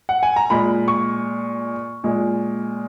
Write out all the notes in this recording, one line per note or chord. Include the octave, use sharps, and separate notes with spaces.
F#5
G#5
A#5
A#2 G#3 B5
C#6
A#2 G#3